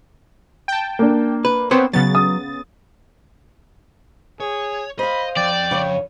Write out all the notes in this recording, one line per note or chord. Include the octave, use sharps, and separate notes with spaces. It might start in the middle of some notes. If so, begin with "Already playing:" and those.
G5 A5
A#3 D4
B4
B3 C4 C5 C#5
C#3 F#3 B3 A6
D#6
G#4 C#5
C5 D#5 F5 B5
F2 D5 G5
C#3 C#5